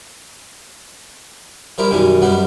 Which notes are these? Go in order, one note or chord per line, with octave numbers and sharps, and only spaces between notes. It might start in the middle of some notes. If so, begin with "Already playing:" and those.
F3 G3 E4 A#4
F#2 B2 D#3 E3 G3
F#2 F#3 G3 B3 D#4